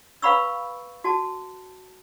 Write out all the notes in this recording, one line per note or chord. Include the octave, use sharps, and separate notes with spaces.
B4 F5 A#5 B5 C#6 E6
F#4 A5